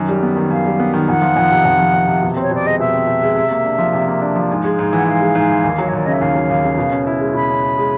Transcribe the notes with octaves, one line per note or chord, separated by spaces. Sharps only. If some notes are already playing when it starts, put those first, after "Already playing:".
Already playing: F#2 D#3
G3
B3
D#3
F#2 F5
G3
B3
D#3
F2 F#5
F3
F2
C3
F2
F3
F2
C3
B2
C4 C#5
B2 D5
G#3 D#5
B2 E5
C4
B2
G#3
C3
A#3
D4
F3
C3
A#3
D4
F3
G#2
G#3
G#2
E3 F#5
G#2 F5
G#3
G#2
E3
D#2
F#3
C#5
D#2 D5
C#3 D#5
E5
D#2 F5
F#3
D#2
C#3
B2
C#4
E4
G#3
B2 B5
C#4
E4
G#3